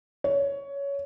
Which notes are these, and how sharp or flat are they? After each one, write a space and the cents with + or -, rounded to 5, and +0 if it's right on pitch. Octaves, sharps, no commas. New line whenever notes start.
C#5 +15